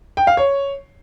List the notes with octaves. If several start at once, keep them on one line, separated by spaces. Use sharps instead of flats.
G5
F5
C#5